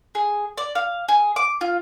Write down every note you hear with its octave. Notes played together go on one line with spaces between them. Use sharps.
G#4
D5
F5
G#4
D6
F4